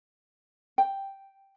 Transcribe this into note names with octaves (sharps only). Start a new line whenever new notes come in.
G5